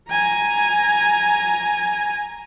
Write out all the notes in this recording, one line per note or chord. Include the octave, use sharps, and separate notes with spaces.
G#5 A#5